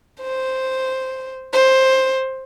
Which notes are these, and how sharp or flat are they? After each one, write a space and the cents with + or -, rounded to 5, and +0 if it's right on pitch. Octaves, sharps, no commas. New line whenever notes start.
C5 +0
C5 +10